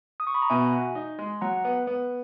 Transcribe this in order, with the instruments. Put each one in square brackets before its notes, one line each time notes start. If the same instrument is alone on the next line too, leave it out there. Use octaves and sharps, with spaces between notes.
[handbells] D#6
C#6
B5
A#5
[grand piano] B2 [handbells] E5 G#5
[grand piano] F#4
D#4
G#3
[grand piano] F#3 [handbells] F#5 A#5
[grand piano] B3
B3